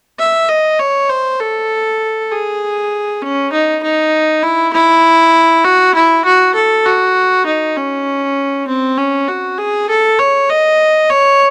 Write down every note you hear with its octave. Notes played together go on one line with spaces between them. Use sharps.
E5
D#5
C#5
C5
A4
G#4
C#4
D#4
D#4
E4
E4
F#4
E4
F#4
A4
F#4
D#4
C#4
C4
C#4
F#4
G#4
A4
C#5
D#5
C#5